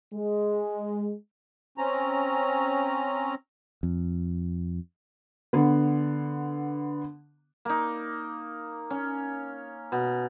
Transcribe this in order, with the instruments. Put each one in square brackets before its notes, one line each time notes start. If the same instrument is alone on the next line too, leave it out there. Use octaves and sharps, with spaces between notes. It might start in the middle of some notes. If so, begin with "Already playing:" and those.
[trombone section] G#3
[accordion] C4 C#4 A#5
[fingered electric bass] F2
[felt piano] D3 B3
[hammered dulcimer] A#3 D#4
C#4
B2